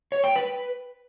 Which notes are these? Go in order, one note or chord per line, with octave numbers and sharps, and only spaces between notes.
C#5
G5
B4